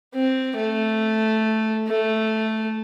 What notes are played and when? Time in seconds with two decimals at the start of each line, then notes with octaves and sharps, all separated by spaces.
0.14 C4
0.57 A3
1.88 A3